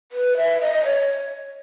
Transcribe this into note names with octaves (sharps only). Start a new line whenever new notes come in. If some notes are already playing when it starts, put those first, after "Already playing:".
B4
E5
D#5
C#5